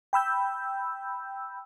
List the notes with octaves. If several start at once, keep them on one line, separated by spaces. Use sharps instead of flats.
G5 B5 E6 G6